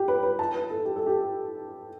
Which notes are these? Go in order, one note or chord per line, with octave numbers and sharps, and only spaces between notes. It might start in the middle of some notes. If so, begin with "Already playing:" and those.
Already playing: G4
B4
B4
A5
B4
A4
G4
A4
G4